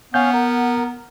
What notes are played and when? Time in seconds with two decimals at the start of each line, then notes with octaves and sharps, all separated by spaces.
0.14 B3 C#4 F5 F#5 G6
0.34 A#4